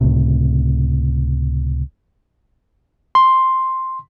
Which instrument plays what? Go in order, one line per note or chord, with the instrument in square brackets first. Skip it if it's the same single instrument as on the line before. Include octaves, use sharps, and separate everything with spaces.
[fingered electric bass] C#2 A2 C3
[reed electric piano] C6